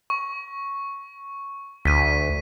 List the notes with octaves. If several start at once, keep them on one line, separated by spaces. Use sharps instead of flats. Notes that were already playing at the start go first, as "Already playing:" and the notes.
C#6
D2 B6 D#7